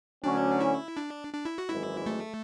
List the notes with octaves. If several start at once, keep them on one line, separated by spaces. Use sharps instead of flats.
D2 D3 F#3 C#4 D4
E4
D4
D4
E4
F#4
G#1 F#2 E3 G#3 E4
A3